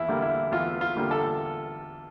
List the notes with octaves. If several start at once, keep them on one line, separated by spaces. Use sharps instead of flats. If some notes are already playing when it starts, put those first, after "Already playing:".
Already playing: E2 E4
D3 G3 A#3
E4
E2 F4
F4
D3 G3 A#3
A4